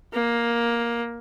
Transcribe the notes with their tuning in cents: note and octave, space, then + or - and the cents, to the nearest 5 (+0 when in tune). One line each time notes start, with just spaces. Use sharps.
A#3 +10